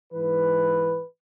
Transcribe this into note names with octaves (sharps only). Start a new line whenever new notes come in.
G#2 E3 B4